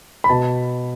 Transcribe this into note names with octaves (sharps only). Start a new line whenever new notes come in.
B5
B2 A5